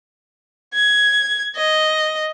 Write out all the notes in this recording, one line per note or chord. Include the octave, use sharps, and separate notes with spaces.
G#6
D#5